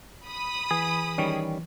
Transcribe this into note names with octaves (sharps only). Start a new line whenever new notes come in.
B5 D#6
E3 G#4
D#3 G3 C#4